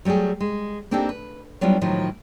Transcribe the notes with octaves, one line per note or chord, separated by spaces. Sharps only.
F#3 G3 A3 G4 G#4
G#3
A#3 C4 D4 D#4 G4 A4
B4
F#3 G3 B3 D4 E4 F4
A2 D#3 F3 F#3